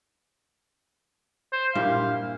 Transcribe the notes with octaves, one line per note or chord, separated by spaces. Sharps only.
C5
G2 A#2 E4 F5